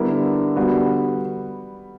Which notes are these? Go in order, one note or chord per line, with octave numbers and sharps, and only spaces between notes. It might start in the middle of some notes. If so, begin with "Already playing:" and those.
Already playing: D3 G3 B3 E4 A#4
G3 B3 F#4 B4